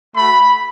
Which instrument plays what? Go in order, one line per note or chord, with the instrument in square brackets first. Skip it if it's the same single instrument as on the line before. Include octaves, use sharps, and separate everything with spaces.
[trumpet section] A3 F#4 B5